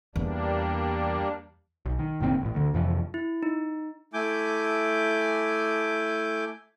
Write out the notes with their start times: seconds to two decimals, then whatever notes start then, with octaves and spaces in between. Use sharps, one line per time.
0.16 E2 G3 A#3 D4
1.86 B1
1.99 D#3
2.20 F#1 A#2 D#3 C4
2.42 A1 A2
2.55 D2 D3
2.74 F2 C3 E3 F3
3.14 E4
3.43 D#4
4.14 A3 E4 G#5 D6 G6